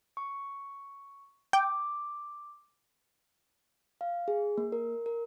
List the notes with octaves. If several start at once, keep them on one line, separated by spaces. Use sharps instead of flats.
C#6
G5 D6
F5
G#4
A#3
A#4
A#4